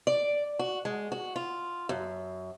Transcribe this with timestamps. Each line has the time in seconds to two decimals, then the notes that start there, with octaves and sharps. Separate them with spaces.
0.07 D5
0.59 F#4
0.85 G#3
1.12 F#4
1.36 F4
1.89 F#2